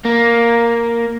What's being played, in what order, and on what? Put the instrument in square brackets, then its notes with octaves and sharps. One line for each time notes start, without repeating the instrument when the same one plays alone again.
[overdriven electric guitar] A#3